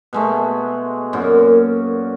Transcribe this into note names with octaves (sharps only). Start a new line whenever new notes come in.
B2 G#3 A3
F#2 A#2 F#3